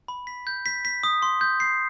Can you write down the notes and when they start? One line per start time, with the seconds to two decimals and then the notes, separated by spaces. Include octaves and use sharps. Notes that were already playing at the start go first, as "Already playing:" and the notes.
0.08 B5
0.27 B6
0.47 G6
0.66 B6
0.85 B6
1.04 D#6
1.22 C6
1.41 G6
1.60 C7